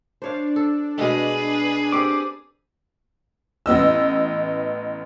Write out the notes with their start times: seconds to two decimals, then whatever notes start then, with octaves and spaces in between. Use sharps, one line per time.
0.22 D4 C5 C#5 F5
0.56 A4
0.98 B2 G#3 A3 G#4 B4
1.92 C4 G4 A4 D6
3.66 A1 B3 D#5 E6